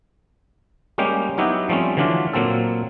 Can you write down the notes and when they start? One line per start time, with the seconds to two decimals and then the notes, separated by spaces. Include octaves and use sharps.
0.98 G3 G#3 A#3 C#4 G4
1.38 F#3 B3 D#4 E4 F#4 G4
1.69 F3 G3 A3 C4 C#4
1.97 D3 E3 F#3 D4 F4
2.33 A#2 F#3 A#3 C4 A4